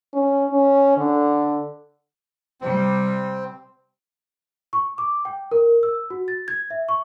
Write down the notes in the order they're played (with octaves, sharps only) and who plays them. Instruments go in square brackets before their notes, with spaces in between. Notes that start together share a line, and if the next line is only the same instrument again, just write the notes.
[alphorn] C#4
C#4
D3
[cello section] C3 G3 [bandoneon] C4
[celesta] C#6
D6
G5
A#4
E6
F#4
A6
G#6
E5
C#6